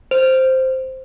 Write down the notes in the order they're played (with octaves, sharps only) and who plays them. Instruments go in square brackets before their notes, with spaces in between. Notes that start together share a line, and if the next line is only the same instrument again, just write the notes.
[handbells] C5